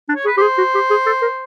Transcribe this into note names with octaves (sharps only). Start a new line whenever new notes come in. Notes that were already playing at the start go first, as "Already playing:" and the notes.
D4
C#5
G#4 B4
G4 G#4 C5
F#4
G4
G#4
A4
A#4